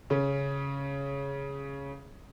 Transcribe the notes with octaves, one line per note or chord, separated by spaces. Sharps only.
C#3 C#4